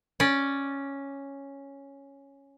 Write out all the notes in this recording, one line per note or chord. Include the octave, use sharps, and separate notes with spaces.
C#4 D5